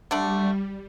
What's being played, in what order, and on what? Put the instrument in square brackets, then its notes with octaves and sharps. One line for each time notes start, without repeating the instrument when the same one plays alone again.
[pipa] D3 A3 D4 [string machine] G3